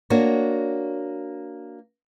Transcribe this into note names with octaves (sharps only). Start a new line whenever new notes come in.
A#3 D4 F#4 C#5